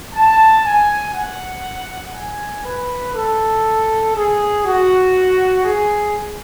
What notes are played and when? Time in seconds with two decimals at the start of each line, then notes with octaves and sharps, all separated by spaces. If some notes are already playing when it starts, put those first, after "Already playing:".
0.13 A5
0.64 G#5
1.14 F#5
2.13 G#5
2.64 B4
3.14 A4
4.15 G#4
4.64 F#4
5.64 G#4